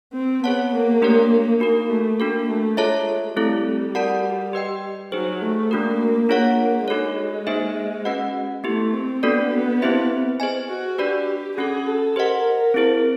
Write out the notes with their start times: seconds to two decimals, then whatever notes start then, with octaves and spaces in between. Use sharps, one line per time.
0.13 C4
0.43 B3 G#4 C#5 F#5 A5
0.73 A#3
1.02 A3 D4 G4 A#4 C#5
1.60 A#3 D#4 F#4 A#4
1.90 A3
2.19 A#3 D4 F#4 A4
2.48 A3
2.77 G#3 F4 A4 C#5 E5 A5
3.37 G3 A3 C4 E4 A4
3.95 F#4 A#4 D5 F#5 A5
4.53 G4 B4 D#5 G5
5.12 F#3 D#4 G#4 C5
5.42 A3
5.71 A3 A#3 D4 F#4 A#4
6.29 A#3 D4 F4 G#4 C#5 F#5
6.88 G#3 D#4 F#4 A4 C#5
7.47 A#3 D#4 G#4 C5 E5
8.05 C#4 F#4 B4 D#5 F#5
8.64 A3 B3 E4 G4
8.94 C4
9.23 A#3 B3 D4 F#4 A4 D5
9.82 C4 E4 G4 C5 E5
10.40 G#4 C5 D#5 G#5
10.69 F#4
10.98 D4 F#4 G4 B4 D5
11.57 C#4 F#4 G#4 A4
11.87 A4
12.16 G4 A#4 C5 D#5 F#5
12.74 C4 E4 G#4 C5